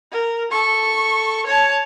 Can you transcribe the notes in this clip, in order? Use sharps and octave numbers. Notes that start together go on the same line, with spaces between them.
A#4
A4 C#6
C#5 A5